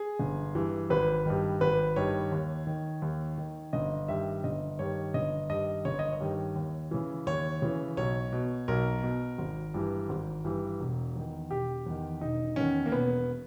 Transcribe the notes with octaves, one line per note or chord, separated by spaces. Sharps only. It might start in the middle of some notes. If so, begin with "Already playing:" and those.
Already playing: G#4
G1
G2 E3
G#1 B4
G2 D#3
G#1 B4
G2 D#3 C#5
D#2
D#3
D#2
D#3
G1 D#5
G2 D#3 E5
G1 D#5
G2 D#3 C#5
G1 D#5
G2 D#3 D#5
G1 C#5
D#5
C#5
G2 D#3
D#2
C#3 E3
D#2 C#5
C#3 E3
B1 C#5
B2
B1 A#4
B2
G#1
G2 E3
G#1
G2 E3
E1
E2 D#3
E1 G4
E2 D#3
E1 D#4
E2 D#3 C#4
A#3
E1 B3